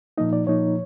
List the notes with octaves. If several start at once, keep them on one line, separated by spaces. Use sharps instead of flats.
A#2 F3 A#3 D#4 D#5
D5
A#2 F3 A#3 D#4 C#5